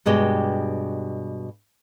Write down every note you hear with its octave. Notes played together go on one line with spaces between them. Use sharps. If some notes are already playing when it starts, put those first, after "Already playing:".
G2 B2 G#3 G4